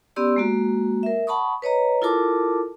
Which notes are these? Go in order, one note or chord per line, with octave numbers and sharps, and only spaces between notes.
B3 C#4 G4 D5 C6 E6
G#3 A#3 F#4
A#4 E5
F#5 A5 B5 C#6 D#6
B4 C#5 D#5 A#5
E4 F4 A4 A#4 A5 D6